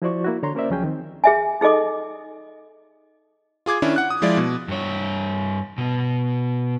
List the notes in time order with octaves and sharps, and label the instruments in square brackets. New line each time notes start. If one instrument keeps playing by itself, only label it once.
[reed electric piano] F3 E4 F#4 C5 D5 C#6
A#3 E4 F#4
D3 C#5 A#5 C6
A#3 C#4 A#4 C5 D5 E5
C#2 F3 F#3 C#4 G#4 G5
D#3 C4
[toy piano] G#4 E5 G#5
D#4 G#4 A4 D#5 D6
[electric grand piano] F4 G#4 D6 G#6
D#3 C#4 D4 E4
F#5 F#6
D#6
F3 G#3 E4 F4 D5
B2
[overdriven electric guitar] G2 C#5
B2